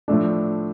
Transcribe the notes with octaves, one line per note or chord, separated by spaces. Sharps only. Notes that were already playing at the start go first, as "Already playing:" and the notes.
A2 F3 A3 D4